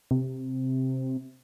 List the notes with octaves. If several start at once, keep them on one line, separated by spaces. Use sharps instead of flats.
C3